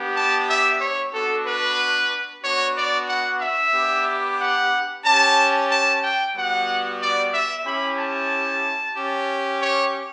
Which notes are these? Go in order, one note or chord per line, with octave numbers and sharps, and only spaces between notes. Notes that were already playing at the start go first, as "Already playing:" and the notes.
Already playing: B3 D4 G4
A5
E5
C#5
B3 D4 F#4 A4
B4
B3 D4 F#4 C#5
D5
F#5
E5
B3 D4 G4
F#5
C#4 G4 A5
A5
G5
G3 B3 F#4 F#5
D5
E5
C#4 E4 G4 B5
A5
C#4 G4
C#5